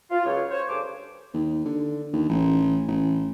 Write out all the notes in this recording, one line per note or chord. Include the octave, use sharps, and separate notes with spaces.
F4
C#2 F#2 C#5
C5 C#5
D2 G2 C#3 C5 D6
D#2
D3
D#2
A1
A1